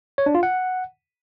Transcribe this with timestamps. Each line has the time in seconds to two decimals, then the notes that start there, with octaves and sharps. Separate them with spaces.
0.18 C#5
0.26 D4
0.35 F4
0.43 F#5